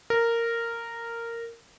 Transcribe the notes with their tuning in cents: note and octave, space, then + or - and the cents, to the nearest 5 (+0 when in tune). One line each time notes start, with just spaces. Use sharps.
A#4 -10